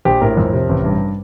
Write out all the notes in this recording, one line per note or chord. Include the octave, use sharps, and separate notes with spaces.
A#1 G4
A2 A#4
F2
C3
A1
G2